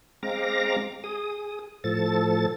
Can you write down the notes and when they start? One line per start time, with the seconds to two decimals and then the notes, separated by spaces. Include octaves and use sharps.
0.23 G#3 C4 F5 A#5 D6 A#6
1.04 G#4 D#6
1.84 A2 F3 A4 A6